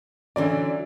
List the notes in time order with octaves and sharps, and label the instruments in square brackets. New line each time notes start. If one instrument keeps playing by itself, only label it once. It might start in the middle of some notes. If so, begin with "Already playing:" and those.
[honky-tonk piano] D3 D5 [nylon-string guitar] E3 F#3 C#4